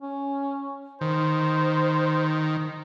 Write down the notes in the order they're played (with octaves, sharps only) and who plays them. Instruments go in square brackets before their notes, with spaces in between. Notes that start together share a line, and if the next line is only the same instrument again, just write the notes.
[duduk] C#4
[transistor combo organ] D#3 [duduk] C5